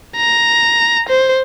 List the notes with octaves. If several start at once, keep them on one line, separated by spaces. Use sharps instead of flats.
A#5
C5